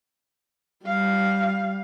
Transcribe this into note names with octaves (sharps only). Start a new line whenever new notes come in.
G3 F5